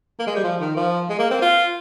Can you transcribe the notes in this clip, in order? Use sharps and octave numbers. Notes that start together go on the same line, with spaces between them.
A#3
G#3
G3
F3
D#3
F3
G#3
A#3
C4
F4